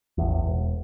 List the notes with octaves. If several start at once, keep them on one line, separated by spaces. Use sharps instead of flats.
A1 E2
E1